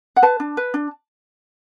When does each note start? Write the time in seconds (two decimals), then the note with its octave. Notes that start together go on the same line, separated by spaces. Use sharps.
0.16 F#5
0.22 B4 A5
0.40 D4
0.57 B4
0.74 D4